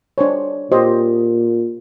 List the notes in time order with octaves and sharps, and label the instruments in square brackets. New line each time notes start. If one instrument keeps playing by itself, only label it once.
[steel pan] D4 C5 C#5
[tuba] A#2 [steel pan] G4 C5 D#5